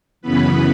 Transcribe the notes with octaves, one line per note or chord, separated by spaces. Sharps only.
F#2 C#3 E3 B3 B4